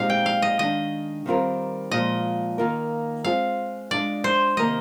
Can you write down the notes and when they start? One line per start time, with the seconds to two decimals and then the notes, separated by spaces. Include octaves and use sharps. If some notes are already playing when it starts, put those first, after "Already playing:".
Already playing: A#2 G#3 C4 D#4 G4 F5
0.10 G5
0.26 F5
0.42 D#5
0.59 D#3 G#3 D4 D#5
1.26 D#3 G3 C4 F4 A#4
1.91 A#2 F3 G#3 D#5
2.58 D#3 A#3 F4 A#4
3.24 G#3 C4 F4 G#4 F5
3.91 G#3 D4 F4 D5
4.24 C5
4.57 C3 D#3 A#3 D#4 A#4 D#5